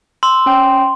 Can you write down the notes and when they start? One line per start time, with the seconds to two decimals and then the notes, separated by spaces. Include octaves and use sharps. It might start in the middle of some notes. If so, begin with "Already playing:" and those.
0.23 C6 E6
0.46 C#4 G5